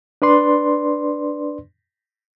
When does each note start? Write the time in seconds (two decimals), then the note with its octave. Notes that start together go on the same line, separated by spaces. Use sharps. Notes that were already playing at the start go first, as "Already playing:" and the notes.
0.22 D4 B4 D5 C6